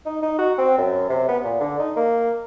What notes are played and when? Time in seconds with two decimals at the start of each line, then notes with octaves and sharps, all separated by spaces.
0.06 D#4
0.22 D#4
0.38 F#4
0.58 C4
0.78 F#2
1.10 C3
1.28 B3
1.44 A#2
1.61 D3
1.79 D#4
1.96 A#3